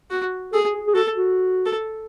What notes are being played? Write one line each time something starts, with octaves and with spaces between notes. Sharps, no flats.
F#4
G#4 A4
G#4
G#4
F#4 A4
F#4
A4